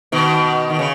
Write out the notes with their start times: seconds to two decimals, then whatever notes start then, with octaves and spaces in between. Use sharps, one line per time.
0.12 B2 D#3
0.70 D#3
0.79 C#3